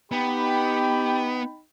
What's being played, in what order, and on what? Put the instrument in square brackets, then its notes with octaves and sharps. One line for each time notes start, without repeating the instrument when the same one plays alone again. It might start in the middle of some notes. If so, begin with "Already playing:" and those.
[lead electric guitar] B3 [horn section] D#4 G5 B5 [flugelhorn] G4